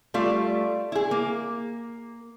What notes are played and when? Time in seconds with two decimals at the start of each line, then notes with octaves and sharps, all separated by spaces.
0.14 G3 A3 F4
0.92 E4 G#4
1.11 A#3